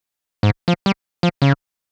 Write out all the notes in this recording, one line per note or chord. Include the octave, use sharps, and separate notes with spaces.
G#2
F3
G3
F3
C#3